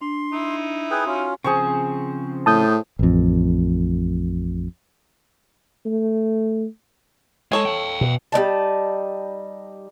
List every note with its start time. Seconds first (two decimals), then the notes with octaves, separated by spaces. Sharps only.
0.01 D4 C6
0.32 D#4 E4
0.91 G#4 B4 G5 D#6
1.06 C#4 F4 F#4
1.44 C#3 F3 C4 G#4 C5 C#6
2.46 A2 A5 D#6 G6
2.99 A1 F2
5.86 A3
7.52 G#3 A4 C#5 G#5
7.65 F5 G5
8.01 B2
8.32 G3 C4 D#4 A5